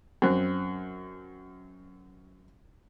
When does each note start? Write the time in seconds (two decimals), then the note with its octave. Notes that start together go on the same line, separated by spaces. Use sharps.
0.22 F#2 C4 F#6